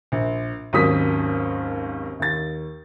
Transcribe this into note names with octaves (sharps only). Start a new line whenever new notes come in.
A#1
G#1 D#2 F#3 C#4 D#6 B6
D#2 A6